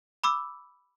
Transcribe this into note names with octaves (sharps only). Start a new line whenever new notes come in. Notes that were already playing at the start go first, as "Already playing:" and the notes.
B5 D6 E6